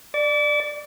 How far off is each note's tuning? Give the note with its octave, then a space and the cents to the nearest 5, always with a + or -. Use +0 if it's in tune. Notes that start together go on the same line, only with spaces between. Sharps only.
D5 +15 D6 -35